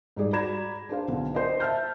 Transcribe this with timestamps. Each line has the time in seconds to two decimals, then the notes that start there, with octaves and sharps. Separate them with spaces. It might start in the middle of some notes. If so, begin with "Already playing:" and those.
0.16 G#2 G3 G#4 D5
0.33 F#4 D5 A#5 B5 G#6 E7
0.89 D4 G#4 C5 F5
1.08 B1 D3
1.34 A#4 C5 D5 D#5
1.60 E5 A5 F6 G6